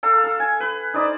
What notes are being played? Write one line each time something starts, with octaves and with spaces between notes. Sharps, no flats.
A4 F5 A#5
A4
G#5
B4
D#4 C5 D5